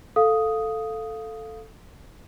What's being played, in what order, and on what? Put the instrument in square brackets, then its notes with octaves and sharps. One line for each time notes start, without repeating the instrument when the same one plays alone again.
[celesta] A4 F5 D#6